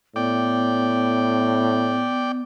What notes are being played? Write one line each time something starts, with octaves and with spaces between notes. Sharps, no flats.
A2 B3 D5 G5